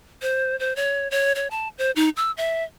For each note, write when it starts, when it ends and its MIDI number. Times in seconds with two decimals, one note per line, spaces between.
0.22 0.58 72
0.59 0.76 72
0.76 1.08 73
1.11 1.33 73
1.35 1.48 73
1.51 1.68 81
1.78 1.91 72
1.96 2.09 63
2.17 2.31 88
2.37 2.64 76